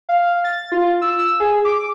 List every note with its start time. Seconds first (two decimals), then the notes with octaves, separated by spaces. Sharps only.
0.09 F5
0.44 A6
0.72 F4
1.02 E6
1.19 E6
1.40 G#4
1.65 D6